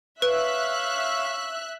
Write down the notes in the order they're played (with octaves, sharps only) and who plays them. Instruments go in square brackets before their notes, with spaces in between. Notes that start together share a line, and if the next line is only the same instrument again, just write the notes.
[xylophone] B4 [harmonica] C#5 F5 E6 [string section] E5 F#6